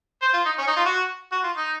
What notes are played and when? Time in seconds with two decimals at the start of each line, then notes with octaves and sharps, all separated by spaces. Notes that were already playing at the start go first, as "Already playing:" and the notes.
0.22 C5
0.33 F4
0.46 D#4
0.58 C#4
0.67 D#4
0.77 F4
0.86 F#4
1.32 F#4
1.44 F4
1.57 D#4